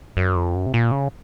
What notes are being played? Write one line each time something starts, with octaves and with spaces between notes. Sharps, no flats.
F#2
F2
F#2
C3
A#2
C#3